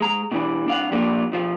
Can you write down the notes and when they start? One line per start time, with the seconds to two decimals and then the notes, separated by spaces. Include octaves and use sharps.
0.01 G#3 A#5
0.32 B2 D3 E3 G3 D4
0.66 C2 D4 F5 F#5
0.91 F3 G3 A#3 D4 F4
1.32 B2 F3 F4